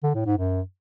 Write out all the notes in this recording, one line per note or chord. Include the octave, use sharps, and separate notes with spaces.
D3
A2
G#2
F#2